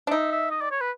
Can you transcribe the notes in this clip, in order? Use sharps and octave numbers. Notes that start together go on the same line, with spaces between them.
D4
D#4 E5
E5
D#5
D5
C#5
B4